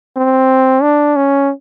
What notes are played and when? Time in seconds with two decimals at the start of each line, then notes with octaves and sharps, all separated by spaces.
0.17 C4
0.82 D4
1.16 C#4